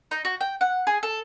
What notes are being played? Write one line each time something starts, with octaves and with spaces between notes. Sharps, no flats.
D#4
F#4
G5
F#5
G#4
A4